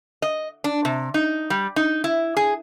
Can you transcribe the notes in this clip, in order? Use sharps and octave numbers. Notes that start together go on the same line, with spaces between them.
D#5
D4
C3
D#4
G3
D#4
E4
G#4